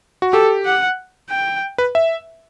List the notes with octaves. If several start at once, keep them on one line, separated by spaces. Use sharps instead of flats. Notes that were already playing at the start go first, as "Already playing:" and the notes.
F#4
G4 A4
F#5
G5
B4
E5